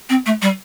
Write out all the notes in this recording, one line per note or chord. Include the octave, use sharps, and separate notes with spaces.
C4
A3
G3